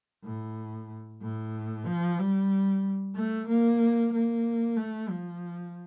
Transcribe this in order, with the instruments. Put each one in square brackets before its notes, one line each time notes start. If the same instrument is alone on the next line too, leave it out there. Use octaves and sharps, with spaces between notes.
[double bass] A2
A2
F3
G3
A3
A#3
A#3
A3
F3